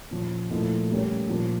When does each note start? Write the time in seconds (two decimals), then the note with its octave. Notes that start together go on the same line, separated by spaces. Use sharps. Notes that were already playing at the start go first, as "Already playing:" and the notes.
0.11 A#2 F3 C#4
0.50 A#2 F3 A3 E4
0.90 A2 G3 A#3 C#4
1.29 A#2 F3 A#3